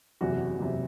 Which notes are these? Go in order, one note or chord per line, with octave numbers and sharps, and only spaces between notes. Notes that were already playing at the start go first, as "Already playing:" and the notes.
F#1 E2 C3 F#4
F#1 E2 C3